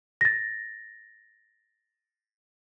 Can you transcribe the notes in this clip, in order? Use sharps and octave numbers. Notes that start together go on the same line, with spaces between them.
A6 A#6